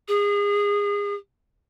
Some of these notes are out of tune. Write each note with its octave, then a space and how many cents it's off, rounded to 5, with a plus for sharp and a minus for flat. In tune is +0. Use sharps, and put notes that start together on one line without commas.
G#4 -30